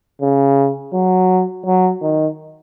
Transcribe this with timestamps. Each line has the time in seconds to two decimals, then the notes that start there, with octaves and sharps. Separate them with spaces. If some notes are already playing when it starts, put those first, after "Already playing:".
0.22 C#3
0.94 F#3
1.66 F#3
2.02 D#3